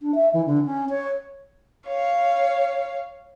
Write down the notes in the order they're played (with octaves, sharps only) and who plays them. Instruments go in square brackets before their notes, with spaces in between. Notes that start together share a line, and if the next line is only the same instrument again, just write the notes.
[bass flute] D4
E5
E3
D3
C#4
C#5
[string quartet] C#5 F5